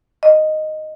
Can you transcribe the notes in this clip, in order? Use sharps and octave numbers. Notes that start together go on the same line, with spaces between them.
D#5